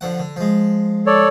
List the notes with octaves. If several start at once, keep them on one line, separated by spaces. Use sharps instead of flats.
D3 F3 F#5
D3
F3 G#3
A4 C#5 D5